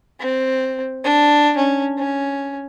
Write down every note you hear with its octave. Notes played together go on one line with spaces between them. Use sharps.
C4
D4
C#4
C#4